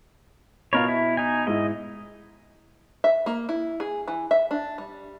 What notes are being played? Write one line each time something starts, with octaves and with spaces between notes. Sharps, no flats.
B2 F4 A#4 C#5 D#5 B5
E4
D#4 G#5
G#2 E4 D#5
E5
A#3
E4
G#4
E3
E5
D4
G3